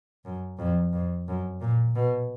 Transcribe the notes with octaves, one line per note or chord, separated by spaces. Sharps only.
F#2
F2
F2
F#2
A#2
B2